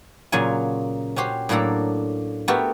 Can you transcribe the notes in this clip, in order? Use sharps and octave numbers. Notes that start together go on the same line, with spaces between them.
A#2 C#3 F#3 F4 G#5
C#4 F#4 G4 C5
A2 F#3 A#3 D4 A4 A#5
A3 B3 F#4 G4 A4 A#4